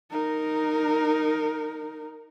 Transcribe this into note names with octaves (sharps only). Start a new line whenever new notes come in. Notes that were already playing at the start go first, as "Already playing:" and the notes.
D#4 A#4